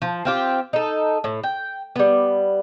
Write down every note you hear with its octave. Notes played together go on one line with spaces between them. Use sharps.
F3
C4 F4 G4
D#4 A4
A2
G5
G3 B3